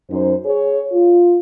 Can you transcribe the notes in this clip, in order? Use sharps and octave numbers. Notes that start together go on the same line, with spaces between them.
F#2 D#4 C5
G#4 C#5
F4